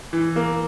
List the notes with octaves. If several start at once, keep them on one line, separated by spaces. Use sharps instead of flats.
E3
A#3